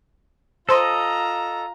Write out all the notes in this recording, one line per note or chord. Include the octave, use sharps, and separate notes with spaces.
F4 A4 C5 D#5 A#5 C6